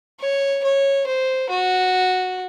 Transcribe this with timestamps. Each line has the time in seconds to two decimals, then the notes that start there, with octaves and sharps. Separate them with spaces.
0.20 C#5
0.64 C#5
1.07 C5
1.49 F#4